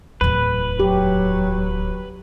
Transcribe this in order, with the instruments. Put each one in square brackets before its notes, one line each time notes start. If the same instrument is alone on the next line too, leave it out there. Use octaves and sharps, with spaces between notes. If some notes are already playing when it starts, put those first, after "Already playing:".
[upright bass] D1 E2 [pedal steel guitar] B4
[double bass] F#3 [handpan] G4